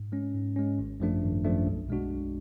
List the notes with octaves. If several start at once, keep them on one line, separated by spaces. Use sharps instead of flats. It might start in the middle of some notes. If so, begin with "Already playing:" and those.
Already playing: G#2
G#3 C#4
G#2
G#3 C#4
G#1
F#2 F3 A3 D4
G#1
F#2 F3 A3 D4
B1
B2 G#3 D4 F#4
B1